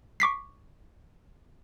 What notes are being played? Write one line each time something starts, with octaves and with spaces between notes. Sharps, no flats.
C#6 D6 B6 C7